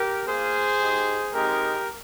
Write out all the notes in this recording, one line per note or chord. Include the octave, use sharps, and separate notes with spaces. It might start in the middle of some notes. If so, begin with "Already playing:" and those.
Already playing: G4 A#4
A#3 F4 G#4 C5
G#3 D#4 G4
G#3 C4 D#4 G4 A#4